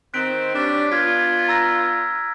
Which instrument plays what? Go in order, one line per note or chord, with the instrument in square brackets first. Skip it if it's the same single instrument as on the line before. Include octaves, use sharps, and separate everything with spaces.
[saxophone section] D#3 C4 [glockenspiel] F#6 B6 D7
[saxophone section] G3 C#4 D4
[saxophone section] B3 D4 F4 [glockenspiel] F6 G#6 B6
[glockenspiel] A#5 E6 A#6